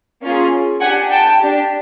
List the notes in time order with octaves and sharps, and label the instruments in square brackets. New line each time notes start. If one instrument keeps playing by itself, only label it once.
[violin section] A#3 C#4 F4 G#4
D4 G4 F#5 G#5
G5 A5
D4 G4